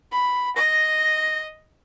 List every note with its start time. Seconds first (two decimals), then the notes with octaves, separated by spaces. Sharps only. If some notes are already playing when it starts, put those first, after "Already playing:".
0.12 B5
0.56 D#5 A#6